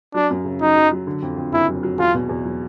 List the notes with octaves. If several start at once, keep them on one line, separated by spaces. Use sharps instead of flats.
F#3 D4
F#2
C#3
F#3 D#4
F#3
F#3
D3
F2
F2
F#1 E4
F#3
F#3
E2 F4
B2
E2
F#3